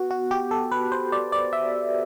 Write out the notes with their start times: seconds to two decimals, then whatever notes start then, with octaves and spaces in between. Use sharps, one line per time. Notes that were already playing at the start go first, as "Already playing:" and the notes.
Already playing: B3 F#4
0.11 F#4
0.31 G4
0.51 A4
0.72 B4
0.92 C5
1.12 D5
1.32 D5
1.53 E5